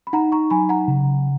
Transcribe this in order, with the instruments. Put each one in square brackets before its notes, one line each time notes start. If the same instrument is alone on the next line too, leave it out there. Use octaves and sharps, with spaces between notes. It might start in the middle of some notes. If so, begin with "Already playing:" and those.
[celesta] B5
[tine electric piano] D#4 [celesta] F#5 A#5
[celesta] A#5 C#6
[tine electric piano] F#3 [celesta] G#5 B5
[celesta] F#5 A#5
[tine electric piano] C#3